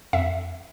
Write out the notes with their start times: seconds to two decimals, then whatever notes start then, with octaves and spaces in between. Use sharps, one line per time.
0.13 F2 E5